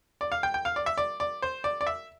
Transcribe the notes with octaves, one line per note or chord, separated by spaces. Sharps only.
D5
F5
G5
G5
F5
D5
E5
D5
D5
C5
D5
D5
E5